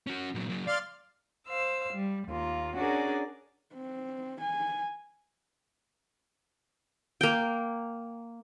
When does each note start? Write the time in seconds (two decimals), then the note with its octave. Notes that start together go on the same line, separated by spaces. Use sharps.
0.07 C#4 F#4
0.35 A#2 F#3
0.49 F#3 A#3
0.67 D5 F5 C6 F6
1.49 C5 F5 E6
1.94 G3
2.28 D#2 A#3 F4
2.78 C#4 D4 F#4 G#4 A#4 D5
3.75 C4
4.41 G#5
7.21 A#3 G5